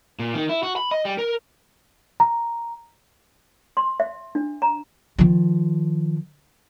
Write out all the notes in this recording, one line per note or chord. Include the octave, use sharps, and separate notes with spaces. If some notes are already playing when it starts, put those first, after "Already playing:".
A#2
D#3
E4
F#4
B5
D#5
G3
A#4
A#5
C6
E5
D4
A#5
D#3 F3